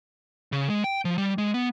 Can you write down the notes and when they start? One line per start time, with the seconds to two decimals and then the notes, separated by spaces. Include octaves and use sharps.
0.52 C#3
0.70 G#3
0.84 G5
1.05 F3
1.18 G3
1.38 G#3
1.54 B3